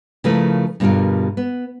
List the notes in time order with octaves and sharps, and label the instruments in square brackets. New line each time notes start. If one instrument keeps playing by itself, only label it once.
[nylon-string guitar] C#3 F3 A3 E4 A#4 B4
G2 B2 D3 G3 F4 A#4
B3